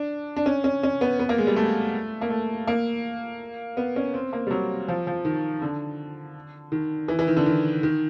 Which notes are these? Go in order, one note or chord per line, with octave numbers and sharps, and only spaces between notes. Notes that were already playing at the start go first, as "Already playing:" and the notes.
Already playing: D4
D4
C#4
C#4
C#4
B3
B3
A#3
G#3
G3
A3
A#3
A3
A#3
B3
C#4
C4
A#3
G3
F#3
F3
F3
D#3
D3
D#3
E3
E3
D#3
D3
D#3
D#3